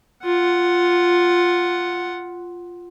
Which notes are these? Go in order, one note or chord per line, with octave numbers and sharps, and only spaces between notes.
F4 F#5